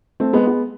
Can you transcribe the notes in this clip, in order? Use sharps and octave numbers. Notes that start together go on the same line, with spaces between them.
A3 C4
G#3 B3
G#3 B3